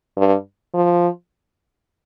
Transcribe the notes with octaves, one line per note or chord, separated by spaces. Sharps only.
G2
F3